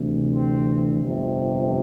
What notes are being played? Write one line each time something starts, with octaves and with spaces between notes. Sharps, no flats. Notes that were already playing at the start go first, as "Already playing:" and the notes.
Already playing: D2 C3 E3
C4
G1 F2 C3